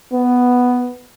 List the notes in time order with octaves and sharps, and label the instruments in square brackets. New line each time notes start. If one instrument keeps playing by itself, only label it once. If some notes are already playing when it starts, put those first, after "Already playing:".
[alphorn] B3